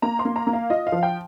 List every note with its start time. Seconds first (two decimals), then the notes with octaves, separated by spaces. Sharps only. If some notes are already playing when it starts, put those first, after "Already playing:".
0.02 A#3 A#5
0.19 C6
0.25 A#3
0.36 A#5
0.47 A#3
0.53 F5
0.70 F4 D#5
0.87 F5
0.92 F3
1.03 G5